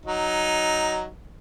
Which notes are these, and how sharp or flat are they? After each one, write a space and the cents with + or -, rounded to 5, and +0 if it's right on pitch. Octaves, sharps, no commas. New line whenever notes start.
F#3 +5 D#4 +0